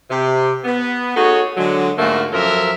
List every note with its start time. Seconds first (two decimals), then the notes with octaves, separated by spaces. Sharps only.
0.10 C3 G4
0.64 B3
1.16 D#4 F#4 G#4 A4 C#5
1.57 D3 F#3 G#3
1.98 G#2 D3 A3 A#3 F4 F#4
2.32 F#2 F3 F#3 A4 A#4 E5